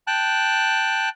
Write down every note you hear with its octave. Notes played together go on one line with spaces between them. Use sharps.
G5 A5 F#6